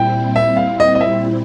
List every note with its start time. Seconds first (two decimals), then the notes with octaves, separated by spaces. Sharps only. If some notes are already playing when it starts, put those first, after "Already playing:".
Already playing: A#2 G3 C4 E4 G5
0.36 E5
0.57 F5
0.80 D#5
0.95 D#5
1.01 E5